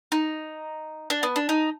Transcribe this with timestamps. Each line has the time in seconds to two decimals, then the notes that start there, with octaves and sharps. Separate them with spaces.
0.12 D#4
1.10 D4
1.23 B3
1.36 D4
1.49 D#4